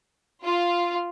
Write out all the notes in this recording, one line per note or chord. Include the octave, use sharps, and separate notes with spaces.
F4